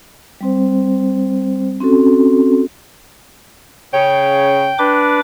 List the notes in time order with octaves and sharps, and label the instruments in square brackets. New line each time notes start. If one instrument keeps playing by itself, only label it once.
[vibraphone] G3 C4 C5
C4 C#4 F#4 A4
[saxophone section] C#3 C#5 [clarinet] G5
[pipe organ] D4 B4 D6